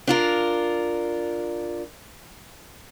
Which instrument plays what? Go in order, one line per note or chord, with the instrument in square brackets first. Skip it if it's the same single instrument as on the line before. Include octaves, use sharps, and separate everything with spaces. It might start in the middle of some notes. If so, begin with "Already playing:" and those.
[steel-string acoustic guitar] D4 F4 A#4